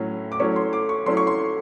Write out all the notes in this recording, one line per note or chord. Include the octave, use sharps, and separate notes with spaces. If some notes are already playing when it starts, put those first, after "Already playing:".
Already playing: A2 F#3 A3 C#4 E4
D6
F#3 A3 C#4 E4 C#6
C6
D6
C#6
F#3 A3 C#4 E4 C6
C#6
C6